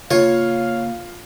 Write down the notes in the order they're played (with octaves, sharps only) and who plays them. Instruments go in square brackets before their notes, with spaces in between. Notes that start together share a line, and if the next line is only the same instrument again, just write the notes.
[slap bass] C#3 A#3 [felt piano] F4 [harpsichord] C#5 [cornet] F5